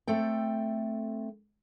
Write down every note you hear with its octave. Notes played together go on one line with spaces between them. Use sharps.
A3 C4 A4 G5